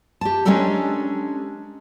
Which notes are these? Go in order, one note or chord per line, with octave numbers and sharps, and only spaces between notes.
G4 A5
G#3 C#4 D4 G4 A4 A#4